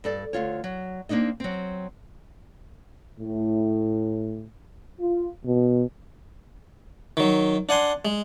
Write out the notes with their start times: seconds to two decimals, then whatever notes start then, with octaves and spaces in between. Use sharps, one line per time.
0.04 G2 A4 D5
0.33 D2 A#2 F4 C#5
0.64 F#3
1.09 A#3 C4 D4 D#4 D#5
1.40 F#3 C4
3.19 A2
5.00 F4
5.45 B2
7.17 D#3 F#3
7.69 D4 F#5 G#5 C6
8.05 G#3